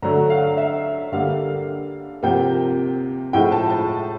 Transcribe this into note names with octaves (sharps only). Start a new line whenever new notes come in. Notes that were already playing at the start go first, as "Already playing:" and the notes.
D3 F#3 A3 A#5
F5
E5
D3 G3 A#3 F5
C3 F3 A#3 G5
A2 F3 G#3 G5
A5
A5